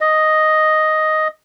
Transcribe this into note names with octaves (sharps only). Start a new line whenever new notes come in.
D#5